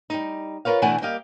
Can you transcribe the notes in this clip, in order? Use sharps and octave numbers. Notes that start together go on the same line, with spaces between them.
G3 D#4
F4 A#4 B4 C#5 F5
B2 E3 A3 D4 F#5 G#5
G3 A#3 G4 D#5 F5